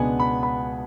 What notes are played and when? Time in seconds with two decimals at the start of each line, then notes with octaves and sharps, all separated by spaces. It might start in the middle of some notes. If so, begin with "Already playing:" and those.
Already playing: C#2 B2 G#3 B3 D4 F#5 G#5
0.20 B5
0.43 B5